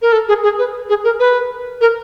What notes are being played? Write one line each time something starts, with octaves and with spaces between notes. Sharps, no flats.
A#4
A4
G#4
G#4
B4
G#4
A#4
B4
A#4